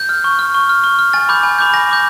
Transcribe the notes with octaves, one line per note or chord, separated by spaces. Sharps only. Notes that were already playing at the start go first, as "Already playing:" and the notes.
Already playing: G6
F6
C#6
F6
C#6
F6
C#6
F6
G#5 A6
B5 D6 G6
G#5
B5 D6 G6
G#5 A#6
B5 D6 G6